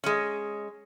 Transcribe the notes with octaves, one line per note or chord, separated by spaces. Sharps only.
G#3 C#4